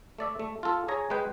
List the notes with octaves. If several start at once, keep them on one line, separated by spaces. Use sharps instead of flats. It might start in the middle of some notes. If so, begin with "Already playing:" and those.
A3 D5 E5
A3
F4 A4
G#4 C#5 G#5 A#5
G#3 G#4 B4 G5